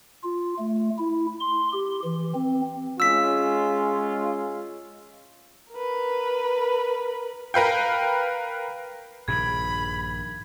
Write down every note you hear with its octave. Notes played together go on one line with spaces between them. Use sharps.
F4
A3
E4
C6
G4
E3
C4
G#3 C#4 F4 E6 B6
A#4 B4
A#4 B4 F5 G5
A#1 G2 D#3 B5 G#6